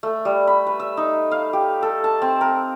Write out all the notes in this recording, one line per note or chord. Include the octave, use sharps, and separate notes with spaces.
A3
G3
B5
B4
E5
D#4
F5
G4
A4
A5
C4
A#4